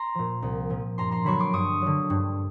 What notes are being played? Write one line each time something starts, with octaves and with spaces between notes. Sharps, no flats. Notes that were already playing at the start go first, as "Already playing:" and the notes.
Already playing: A#5 C6
A#2 F3
C2
A#2 F3
G2 A#5 C6
A#5 C6
D3 F#3 B5 C#6
C6 D6
G2 C#6 D#6
D3 F#3
G2